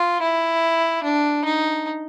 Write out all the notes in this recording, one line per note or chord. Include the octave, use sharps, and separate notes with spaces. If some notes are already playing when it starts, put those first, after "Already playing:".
Already playing: F4
E4
D4
D#4